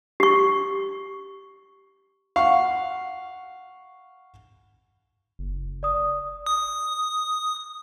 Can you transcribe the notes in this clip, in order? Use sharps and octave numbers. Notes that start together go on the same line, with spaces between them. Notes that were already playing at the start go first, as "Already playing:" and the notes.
G4 C#6
F5 F#5 C#6
F#1
D5 D#6
D#6